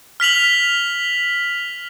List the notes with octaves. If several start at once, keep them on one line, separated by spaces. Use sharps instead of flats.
F6 B6 F7 F#7